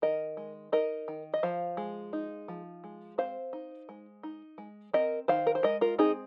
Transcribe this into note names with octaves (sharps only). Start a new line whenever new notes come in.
D#3 A#4 D#5
G#3
D#4 A#4 D#5
D#3
D#5
F3 C5 F5
G#3
D#4
F3
G#3
C4 C5 F5
D#4
G#3
D#4
G#3
C4 A#4 D#5
D#3 C5 F5
A#4
C5
G#3 A#4 D#5
F4 A#4
C4 D#4 G#4